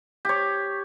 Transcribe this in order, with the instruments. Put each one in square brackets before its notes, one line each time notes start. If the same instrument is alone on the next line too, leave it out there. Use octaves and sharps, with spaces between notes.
[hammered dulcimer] G4 C#5